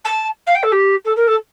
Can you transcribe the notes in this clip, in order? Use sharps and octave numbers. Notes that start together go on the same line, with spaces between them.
A5
F5
G5
A4
G4
A4
A#4
A4